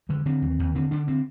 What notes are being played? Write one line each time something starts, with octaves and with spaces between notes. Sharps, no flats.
D3 G#3
D3 C4
D#2
D#2
D3 C4
D3 D4
D3 C4